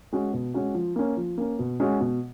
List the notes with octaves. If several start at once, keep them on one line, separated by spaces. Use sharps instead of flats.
G#3 C#4 F#4
B2
G#3 C#4 F#4
F3
A#3 C#4
F3
A#3 C#4
B2
G#3 C#4 F#4
B2